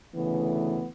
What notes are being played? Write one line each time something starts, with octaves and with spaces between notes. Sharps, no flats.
D2 C#3 E3 A3 B3